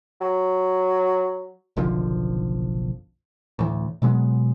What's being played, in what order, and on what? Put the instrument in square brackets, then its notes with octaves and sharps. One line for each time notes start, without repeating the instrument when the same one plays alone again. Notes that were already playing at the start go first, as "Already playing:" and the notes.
[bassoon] F#3
[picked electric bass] F#1 B1 D3 F3
D2 A2 E3
B2 F#3 G#3 B3